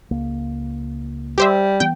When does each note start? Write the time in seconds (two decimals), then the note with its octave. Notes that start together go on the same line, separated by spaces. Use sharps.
0.11 C#2 A#3
1.38 G3 G4 C5 E5
1.80 E3 B3 G5